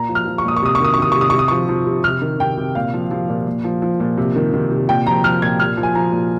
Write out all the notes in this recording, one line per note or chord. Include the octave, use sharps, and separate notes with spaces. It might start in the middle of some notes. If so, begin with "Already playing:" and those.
Already playing: A#2 A#5
F3
F6
F3
C#6
A#2 D#6
C#6
C3 D#6
C#6
D#3 D#6
C#6
D#3 D#6
C#6
C3
D#6
C3 C#6
D#6
F3 C#6
F3
C3
C3 F6
D#3
D#3 G5
C3
A#2 F5
F3
F3
A#2
A#2
F3
F3
A#2
C3
D#3
D#3
C3
A#2 G5
F3 A#5
F3 F6
A#2 G#6
A#2 F6
F3
G#5
F3 A#5
A#2